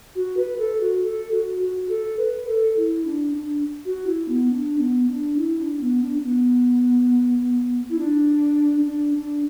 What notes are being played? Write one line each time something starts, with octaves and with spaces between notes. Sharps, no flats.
F#4
B4
A4
F#4
A4
F#4
F#4
A4
B4
A4
E4
D4
D4
F#4
E4
B3
D4
B3
D4
E4
D4
B3
D4
D4
B3
E4
D4
D4
D4